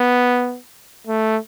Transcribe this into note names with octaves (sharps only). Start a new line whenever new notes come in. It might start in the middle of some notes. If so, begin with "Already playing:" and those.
Already playing: B3
A3